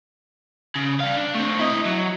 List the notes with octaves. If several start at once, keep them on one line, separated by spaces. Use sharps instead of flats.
C#3
G3 F5
D4
A3 C4
E4 D#5
F#3